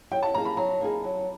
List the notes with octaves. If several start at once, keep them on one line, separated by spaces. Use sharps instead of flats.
F#3 G5
A5
A#3 D#4 G#4 A#5
B5
F#3 A#5
A#3 D#4 G#4
F#3